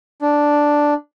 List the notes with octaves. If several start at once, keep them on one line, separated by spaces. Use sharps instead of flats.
D4